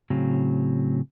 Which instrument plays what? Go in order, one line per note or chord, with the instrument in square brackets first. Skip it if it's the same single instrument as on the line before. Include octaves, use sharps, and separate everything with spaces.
[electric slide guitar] A2 C#3 F#3 C4